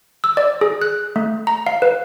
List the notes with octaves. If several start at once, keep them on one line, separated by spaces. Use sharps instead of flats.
E6
D5
G#4
F#6
A3
A#5
F5
B4